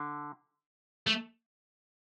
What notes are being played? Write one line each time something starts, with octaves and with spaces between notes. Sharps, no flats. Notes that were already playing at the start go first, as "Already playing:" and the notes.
Already playing: D3
A3